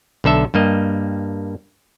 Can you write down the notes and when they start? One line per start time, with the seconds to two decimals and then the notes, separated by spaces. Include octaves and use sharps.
0.24 B1 D3 A4 E5
0.54 G2 G3 A#3 D#5